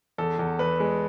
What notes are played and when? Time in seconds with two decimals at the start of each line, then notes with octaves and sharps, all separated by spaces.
0.18 E2 A4
0.39 E2
0.59 E2 B4
0.80 G#3